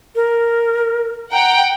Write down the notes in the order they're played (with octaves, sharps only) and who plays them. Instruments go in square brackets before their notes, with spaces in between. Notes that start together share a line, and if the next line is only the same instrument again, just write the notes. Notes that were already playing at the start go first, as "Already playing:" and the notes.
[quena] A#4
[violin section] F#5 G5 [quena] A#5